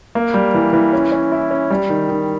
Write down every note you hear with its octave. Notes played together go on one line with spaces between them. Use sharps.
A#3
G3
E3
E3
C#4
C#4
E4
C#4
G3
D#3
D#3